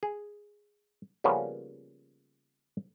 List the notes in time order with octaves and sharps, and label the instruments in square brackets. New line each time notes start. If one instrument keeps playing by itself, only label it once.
[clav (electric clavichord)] G#4
C#3 F3 G3 A#3 B3 C#4